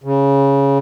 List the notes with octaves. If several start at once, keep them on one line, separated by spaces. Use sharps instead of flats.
C#3